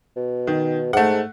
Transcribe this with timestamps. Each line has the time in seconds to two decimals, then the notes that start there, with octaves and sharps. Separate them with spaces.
0.17 B2
0.47 D#3
0.93 G#2 A3 F#5